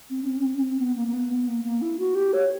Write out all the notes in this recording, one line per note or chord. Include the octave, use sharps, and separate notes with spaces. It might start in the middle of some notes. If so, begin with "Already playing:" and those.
C4
C#4
C4
C#4
C4
C#4
C4
B3
A#3
A#3
B3
B3
A#3
A#3
E4
F#4
G4
C#5